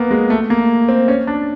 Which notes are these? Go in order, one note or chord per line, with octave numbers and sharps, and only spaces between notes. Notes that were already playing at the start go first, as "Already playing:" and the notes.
Already playing: A#3 B3
G#3
A3
A#3
C4
C#4
D4